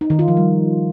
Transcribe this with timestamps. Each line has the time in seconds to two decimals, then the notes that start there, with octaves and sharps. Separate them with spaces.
0.01 D#4
0.10 D#3
0.19 F4
0.28 F3
0.37 G3